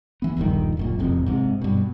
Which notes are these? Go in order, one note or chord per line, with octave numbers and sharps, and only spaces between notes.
E3 B3
D#1 A#1 G2 D#3
F#1 F#2 A#2
E1 A1 F2 C3
G#2 C3
G2 B2